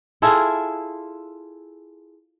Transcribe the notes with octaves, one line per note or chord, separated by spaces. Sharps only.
E4 F4 G#4 A4